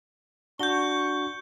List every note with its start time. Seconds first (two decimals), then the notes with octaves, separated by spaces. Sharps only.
0.59 D4 F#4 C#6 G6 G7